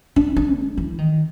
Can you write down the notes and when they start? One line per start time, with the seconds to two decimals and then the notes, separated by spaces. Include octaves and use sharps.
0.16 D4
0.36 D4
0.57 G#3
0.77 E3
0.98 D#3